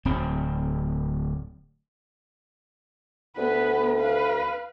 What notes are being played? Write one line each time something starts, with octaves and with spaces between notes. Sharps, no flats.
D1 C4
D2 B3 B4
B4 F5